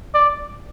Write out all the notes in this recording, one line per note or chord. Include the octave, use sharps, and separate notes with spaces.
D5